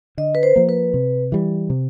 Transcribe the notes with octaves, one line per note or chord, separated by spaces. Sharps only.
D3 D#5
B4
C5
F3 A#3
B4
C3
E3 G3
C3